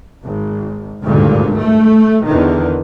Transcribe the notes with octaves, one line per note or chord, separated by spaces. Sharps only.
G#1
G#1 D2 G2 A#2 D3
A3
E2 D3 D#3